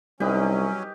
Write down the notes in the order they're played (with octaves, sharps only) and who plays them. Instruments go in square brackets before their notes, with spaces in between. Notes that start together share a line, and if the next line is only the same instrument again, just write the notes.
[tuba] C2 [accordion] F#3 C#4 [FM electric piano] G3 D#4 [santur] G4 B4 D#5